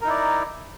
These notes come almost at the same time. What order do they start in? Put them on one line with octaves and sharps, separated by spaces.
A#4 D#4 E4 D5